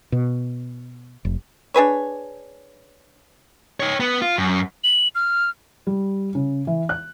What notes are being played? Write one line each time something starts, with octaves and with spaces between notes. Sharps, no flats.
B2
F1
D4 G#4 B4 C#5
D#4 C#5
B3
F4
F#2
F#7
F6
G3
C#3
E3
F#6